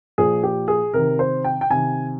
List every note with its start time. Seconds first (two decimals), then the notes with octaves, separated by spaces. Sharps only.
0.18 A#2 F3 G#4
0.43 G4
0.68 G#4
0.94 C3 D#3 A#4
1.19 C5
1.45 G5
1.61 G5
1.70 C3 D#3 G#5